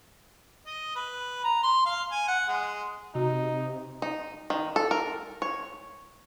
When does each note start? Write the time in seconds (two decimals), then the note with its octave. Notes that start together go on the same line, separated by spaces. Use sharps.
0.66 D#5
0.96 B4
1.44 A#5
1.63 C6
1.86 F5
2.11 G#5
2.28 F#5
2.49 G#3
3.15 C3 D#4 F#4
4.02 D#4
4.50 D#3
4.76 A4
4.91 A#4
5.42 C#5